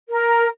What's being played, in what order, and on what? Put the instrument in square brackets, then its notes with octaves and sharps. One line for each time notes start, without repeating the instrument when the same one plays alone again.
[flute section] A#4